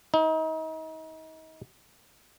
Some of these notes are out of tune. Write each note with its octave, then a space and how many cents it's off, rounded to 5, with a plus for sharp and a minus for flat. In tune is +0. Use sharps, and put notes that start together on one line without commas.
D#4 +35